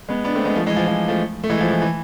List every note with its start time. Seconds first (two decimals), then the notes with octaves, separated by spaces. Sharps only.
0.09 G#3 B3
0.24 B3 D4
0.35 A3 C4
0.45 G#3 B3
0.56 F3 A3
0.66 E3 G#3
0.76 F3
0.87 F3
1.08 F3 A3
1.44 A3
1.50 E3 G#3
1.61 F3
1.71 E3
1.82 E3